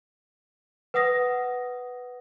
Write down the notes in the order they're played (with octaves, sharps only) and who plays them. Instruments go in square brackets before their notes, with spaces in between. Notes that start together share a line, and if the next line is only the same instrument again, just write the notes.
[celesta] B4 F#5 D#6 A#6